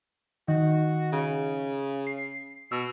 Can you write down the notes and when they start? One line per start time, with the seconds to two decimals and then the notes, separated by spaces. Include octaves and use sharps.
0.48 D#3 F#4
1.12 C#3
2.07 C7
2.72 B2 E6